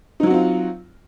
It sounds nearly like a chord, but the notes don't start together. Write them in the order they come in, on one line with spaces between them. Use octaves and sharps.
D#4 F#3 F#4 C4 F4